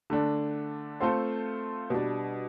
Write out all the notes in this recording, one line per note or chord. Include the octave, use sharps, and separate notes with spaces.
D3 A3 D4
A3 C4 F4 A4 C5
B2 G3 D4